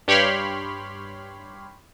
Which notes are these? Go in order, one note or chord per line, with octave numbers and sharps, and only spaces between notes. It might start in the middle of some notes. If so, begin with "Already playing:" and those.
G2 G4 C#5 B5 C6 F6